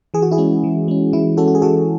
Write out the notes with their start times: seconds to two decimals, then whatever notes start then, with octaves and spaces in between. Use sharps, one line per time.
0.14 E3 G#4
0.22 F#4
0.31 E4 G#4
0.38 G#3 C#4
0.64 E3
0.88 G#3 C#4
1.13 E3 E4
1.37 G#3 C#4 F#4 A4
1.48 F#4
1.55 G#4
1.62 E3 F#4 A4